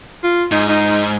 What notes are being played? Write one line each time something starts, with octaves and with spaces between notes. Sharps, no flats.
F4
G#2 D#4
D#4